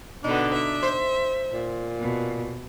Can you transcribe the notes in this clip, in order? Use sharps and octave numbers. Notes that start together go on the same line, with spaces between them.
B2 D3 B3 D4 D#4
E5
C5
A#2
B2